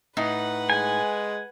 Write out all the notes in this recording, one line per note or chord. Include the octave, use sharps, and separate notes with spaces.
A2 D#4 B4 F#5
G#3 G#5